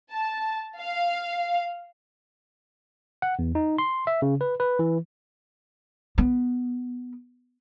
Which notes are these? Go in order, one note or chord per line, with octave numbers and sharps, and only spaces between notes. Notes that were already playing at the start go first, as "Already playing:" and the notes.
A5
F5
F#5
E2
D#4
C6
E5
C#3
B4
B4
E3
B3